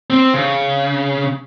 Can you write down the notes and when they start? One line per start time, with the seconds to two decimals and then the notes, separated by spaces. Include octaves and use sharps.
0.10 C4
0.34 C#3